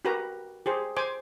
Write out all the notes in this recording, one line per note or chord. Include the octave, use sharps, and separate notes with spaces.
F#4 G4 A#4 B4 A#5
G4 G#4 C5
C5 G#5 D6